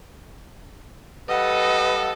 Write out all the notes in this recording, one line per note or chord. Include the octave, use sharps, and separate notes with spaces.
G3 A4 B4 D#5 F5 F#5